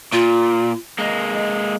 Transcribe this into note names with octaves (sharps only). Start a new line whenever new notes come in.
A#2 F4
G#3 A#3 D#5